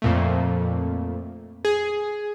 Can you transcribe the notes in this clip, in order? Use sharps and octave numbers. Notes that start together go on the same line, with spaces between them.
F2 A#2 A3
G#4